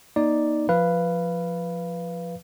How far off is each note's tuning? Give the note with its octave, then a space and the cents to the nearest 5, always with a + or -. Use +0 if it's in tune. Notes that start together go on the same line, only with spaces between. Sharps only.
A#3 +40 D#4 +0 D5 +0
F3 +5 B4 +0 F5 -20